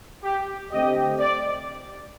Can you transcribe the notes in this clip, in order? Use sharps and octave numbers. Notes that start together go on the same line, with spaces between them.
G4
D3 A3 C4 G4 D#5
D5